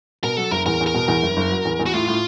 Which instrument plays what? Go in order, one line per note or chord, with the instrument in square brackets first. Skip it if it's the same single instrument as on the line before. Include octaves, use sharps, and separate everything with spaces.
[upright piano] B2 [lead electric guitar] A#4
[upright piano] F#3 [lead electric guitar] A4
[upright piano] F#1 [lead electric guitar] A#4
[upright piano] E2 [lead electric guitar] A#4
[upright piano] E2
[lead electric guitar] A#4
[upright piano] B2
E2
F#1
F#1
F#3
E2
E2
[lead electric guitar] F#4
[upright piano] A2 [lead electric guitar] F4
[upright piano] A2